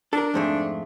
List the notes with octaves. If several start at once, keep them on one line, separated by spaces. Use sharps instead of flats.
D4 A4 A#4
F2 G#2 A3